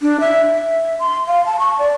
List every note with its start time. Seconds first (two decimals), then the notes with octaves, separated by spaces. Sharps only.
0.02 D4
0.20 E5
0.51 E5
0.99 C6
1.28 F5
1.46 A5
1.59 C#6
1.79 D5